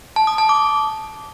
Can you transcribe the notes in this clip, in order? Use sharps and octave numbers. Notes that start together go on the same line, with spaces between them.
A5
D#6
A5
D6